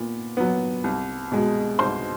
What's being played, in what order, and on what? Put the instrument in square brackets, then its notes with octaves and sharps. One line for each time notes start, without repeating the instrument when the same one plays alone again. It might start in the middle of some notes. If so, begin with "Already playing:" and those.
Already playing: [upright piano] A#2 B3
F#3 B3
C2
B2 G#3
C2 C5 C6